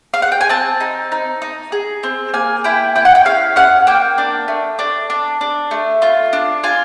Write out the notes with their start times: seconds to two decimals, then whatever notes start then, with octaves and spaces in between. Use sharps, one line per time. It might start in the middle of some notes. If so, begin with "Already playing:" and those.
0.14 F5
0.22 F#5
0.32 G5
0.41 G#5
0.49 C4 A5
0.80 D#4
1.12 D#4
1.42 D#4
1.72 G#4
2.03 C4
2.34 A#3 G#5
2.64 E4 G5
2.95 E4 G5
3.05 F#5
3.15 G5
3.25 C#4 F5
3.56 C#4 F#5
3.87 A#3 G5
4.18 D4
4.48 A3
4.79 D4
5.10 D4
5.41 D4
5.71 A3
6.02 F4
6.33 D4
6.64 F4 G#5